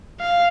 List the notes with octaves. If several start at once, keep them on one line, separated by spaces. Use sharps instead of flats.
F5